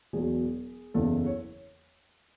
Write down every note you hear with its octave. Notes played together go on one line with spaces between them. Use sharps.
E1 E2 B2 F#3 G#4
F#1 E2 C#3 E3 A4
C#5